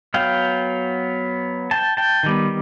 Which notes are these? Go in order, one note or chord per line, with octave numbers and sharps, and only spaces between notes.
F#3 B3 F5 G5
G5 A5
G5 A5
D#3 G3 B3